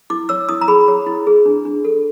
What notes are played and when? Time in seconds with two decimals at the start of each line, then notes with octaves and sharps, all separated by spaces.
0.10 E4 D6
0.29 C#5 E6
0.49 E4 D#6
0.61 A#5
0.68 G#4 B5
0.88 C#5
1.07 E4
1.27 G#4
1.46 D4
1.65 D4
1.85 A4